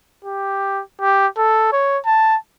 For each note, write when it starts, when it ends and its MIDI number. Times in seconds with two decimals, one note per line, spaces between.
0.25 0.82 67
1.02 1.27 67
1.38 1.68 69
1.73 1.99 73
2.06 2.37 81